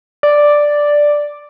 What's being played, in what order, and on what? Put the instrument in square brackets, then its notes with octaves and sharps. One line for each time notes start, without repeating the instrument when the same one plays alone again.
[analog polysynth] D5